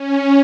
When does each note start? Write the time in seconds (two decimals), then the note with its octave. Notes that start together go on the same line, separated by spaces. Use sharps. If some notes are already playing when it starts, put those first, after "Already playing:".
Already playing: C#4